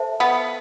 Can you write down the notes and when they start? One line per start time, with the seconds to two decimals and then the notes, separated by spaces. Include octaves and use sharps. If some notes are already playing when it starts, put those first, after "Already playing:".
Already playing: A4 C5 E5 A5
0.20 B3